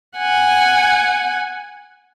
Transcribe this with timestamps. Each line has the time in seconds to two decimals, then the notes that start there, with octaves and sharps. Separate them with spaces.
0.18 F#5 G#5